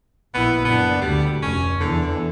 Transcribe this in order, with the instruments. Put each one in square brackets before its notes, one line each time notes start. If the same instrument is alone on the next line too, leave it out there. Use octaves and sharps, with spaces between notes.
[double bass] A#1 E4 [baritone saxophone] B3
[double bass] F#1 D4 [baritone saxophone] B3
[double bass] D2 [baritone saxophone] G3
[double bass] F1 [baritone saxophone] C#4
[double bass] E2 E3 [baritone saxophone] D3